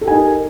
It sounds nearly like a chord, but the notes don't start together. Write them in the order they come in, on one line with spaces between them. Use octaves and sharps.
A4 G4 G#5 D#4 A#4